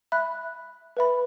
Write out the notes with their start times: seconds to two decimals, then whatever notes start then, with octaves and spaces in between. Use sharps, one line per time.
0.12 E5 B5 F#6
0.97 B4 E5 B5